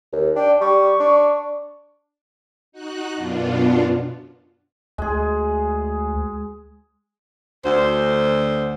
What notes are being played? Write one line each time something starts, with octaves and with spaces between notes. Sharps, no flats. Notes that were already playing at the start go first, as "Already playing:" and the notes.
D#2
D4 G5
G3 C#6
D4
D#4 F#4 F#6
F#2 B2 B3 D4 F4
D2 G#3 G#4
D2 C5